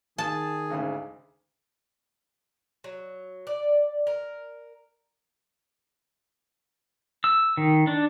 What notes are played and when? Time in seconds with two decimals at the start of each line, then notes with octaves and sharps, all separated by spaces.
0.18 D#3 G#4 A5
0.70 D2 G#2 C#3
2.84 F#3
3.47 D5
4.07 A#4
7.24 E6
7.57 D#3
7.87 D4